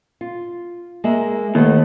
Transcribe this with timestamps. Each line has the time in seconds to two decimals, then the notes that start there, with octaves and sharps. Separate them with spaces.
0.21 F4
1.04 G#3 A#3 E5
1.55 D#2 A3 B3